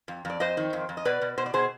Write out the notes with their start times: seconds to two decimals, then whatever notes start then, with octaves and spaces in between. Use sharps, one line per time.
0.08 F2
0.25 F2 D5
0.40 F2 C5 D#5
0.57 D#3
0.73 F2
0.89 F2
0.97 D#5
1.05 B2 B4 D5
1.21 B2
1.38 B2 C5
1.46 D5
1.54 B2 G#4 C5